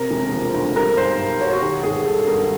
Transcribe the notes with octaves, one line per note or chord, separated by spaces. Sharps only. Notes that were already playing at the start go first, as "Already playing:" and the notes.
Already playing: C3 A#4
E1
F3
D2
G3 A#4
B1 C5
B1
B2 C#5
F#4
D#3 G4
G#1 G#4
G3 A4
G2 A#4